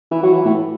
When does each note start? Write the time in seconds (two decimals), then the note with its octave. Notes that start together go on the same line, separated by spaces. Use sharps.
0.11 E3
0.23 F#3
0.33 E3
0.45 A2